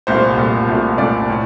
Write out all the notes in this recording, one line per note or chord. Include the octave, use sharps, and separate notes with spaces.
C2 A#2 A3 C5
C2 A#2 A3
C2 A#2 A3
C2 A#2 A3 D5
A2